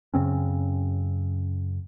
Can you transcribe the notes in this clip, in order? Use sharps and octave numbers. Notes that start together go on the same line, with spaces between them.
F#2 C#3 C4 C#4